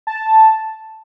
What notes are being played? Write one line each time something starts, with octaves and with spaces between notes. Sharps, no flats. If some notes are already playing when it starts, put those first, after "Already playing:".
A5